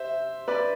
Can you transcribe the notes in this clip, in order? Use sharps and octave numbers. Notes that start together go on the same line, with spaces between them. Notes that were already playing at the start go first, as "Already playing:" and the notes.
Already playing: C5 E5
B4 D5